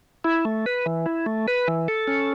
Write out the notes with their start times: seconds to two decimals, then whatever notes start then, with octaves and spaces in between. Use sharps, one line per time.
0.24 E4
0.45 A3
0.66 B4
0.86 E3
1.06 E4
1.26 A3
1.48 B4
1.68 E3
1.88 A4
2.07 C#4